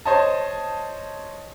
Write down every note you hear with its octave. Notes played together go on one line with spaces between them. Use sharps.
C5 C#5 D#5 A5